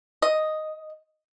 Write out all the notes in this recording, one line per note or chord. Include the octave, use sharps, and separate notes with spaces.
D#5